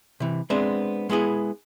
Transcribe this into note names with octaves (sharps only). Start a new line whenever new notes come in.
C3 E3
G#3 B3 C4 D4 E5
G#3 B3 E4 G#4